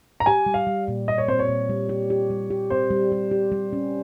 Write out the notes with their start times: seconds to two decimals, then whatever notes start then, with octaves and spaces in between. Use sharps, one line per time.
0.20 A#5
0.26 G4 G#5
0.46 G3
0.54 F5
0.67 G3
0.88 A#2
1.08 A#2 D#5
1.18 C#5
1.28 C4 C5
1.39 C#5
1.49 A#2
1.69 G3
1.89 G4
2.10 G4
2.30 G3
2.50 G4
2.70 C4 C5
2.91 G3
3.12 G3
3.31 G4
3.52 G3
3.73 C#4